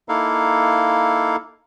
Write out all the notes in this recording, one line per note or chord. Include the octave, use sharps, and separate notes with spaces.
A#3 D#4 E4 A4 F5